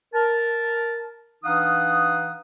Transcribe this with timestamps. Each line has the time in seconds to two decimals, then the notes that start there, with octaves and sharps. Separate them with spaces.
0.14 A#4 A5
1.44 E3 D4 D#4 F5 F#5 D#6